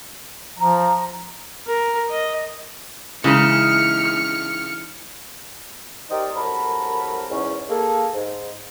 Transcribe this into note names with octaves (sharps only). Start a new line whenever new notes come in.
F3 A#5
A#4
D#5
C#3 E3 G#3 D#4 F6 C#7
D#4 G4 A#4 C5 D5 D#5
C2 F#3 A4 A#4 B5
E2 G#2 C#4
A#3 G#4 A4
G#2